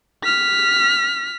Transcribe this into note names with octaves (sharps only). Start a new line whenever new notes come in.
F6 B6